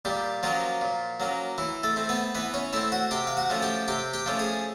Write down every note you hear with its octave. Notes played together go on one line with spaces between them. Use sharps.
A#2 G3 G4
F3 F#3 A#3 C#4 F4
A#2
F#3 A#3 C#4
E3 E4
A3 A4
A3 C4
B3 B4
E3 B3 B4
C#4 C#5
A3 C4 E4 E5
F#4 F#5
C3 G4 G5
F5
F#4 F#5
F3 A3 C#4
G4 G5
C3 G4 G5
G4 G5
F3 A3 C#4
G#4 G#5